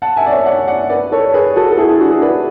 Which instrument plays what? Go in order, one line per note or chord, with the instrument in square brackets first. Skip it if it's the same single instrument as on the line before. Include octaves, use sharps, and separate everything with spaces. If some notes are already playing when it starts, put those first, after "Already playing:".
[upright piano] F#5 A5
E5 G#5
D5
C#5 E5
D5 F#5
D5 F#5
B4 D5
A4 C#5
G#4 B4
F#4 A4
A4
E4 G#4
E4 G#4
D4 F#4
E4 G#4
B4 D5